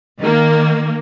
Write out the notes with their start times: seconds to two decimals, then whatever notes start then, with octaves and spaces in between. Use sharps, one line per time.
0.20 D#3 A#3